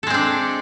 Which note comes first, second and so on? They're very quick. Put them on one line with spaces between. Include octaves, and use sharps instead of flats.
A4 G#3 C4 D4